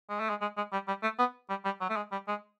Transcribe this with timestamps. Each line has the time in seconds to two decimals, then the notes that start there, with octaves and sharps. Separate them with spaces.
0.09 G#3
0.19 A3
0.29 G#3
0.41 G#3
0.57 G#3
0.72 G3
0.87 G3
1.03 A3
1.19 B3
1.49 G3
1.65 G3
1.80 F#3
1.89 A3
1.96 G#3
2.12 G3
2.28 G#3